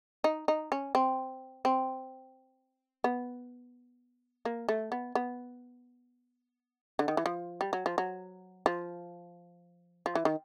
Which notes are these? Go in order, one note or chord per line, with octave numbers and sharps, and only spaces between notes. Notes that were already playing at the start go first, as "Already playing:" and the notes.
D#4
D#4
C#4
C4
C4
B3
A#3
A3
B3
B3
D3
D#3
E3
F3
G3
F#3
F3
F#3
F3
F3
E3
D#3